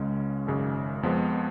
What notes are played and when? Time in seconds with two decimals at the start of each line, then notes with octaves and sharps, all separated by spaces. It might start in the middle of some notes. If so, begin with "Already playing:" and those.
Already playing: C#2 C#3 G#3 C#4
0.47 G#1 F#2 C#3 G#3
1.03 F2 F3 G#3 B3
1.33 B3